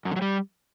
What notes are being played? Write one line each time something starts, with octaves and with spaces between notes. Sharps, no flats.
F#2
D3
F#3
G3